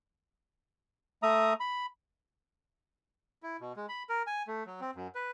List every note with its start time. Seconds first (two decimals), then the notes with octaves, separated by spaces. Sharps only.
1.23 A3 E5 A#5 D#6
1.60 B5
3.43 E4
3.61 B2
3.77 G#3
3.89 B5
4.10 A#4
4.27 G#5
4.48 A3
4.66 F#3
4.81 C4
4.95 F#2
5.15 B4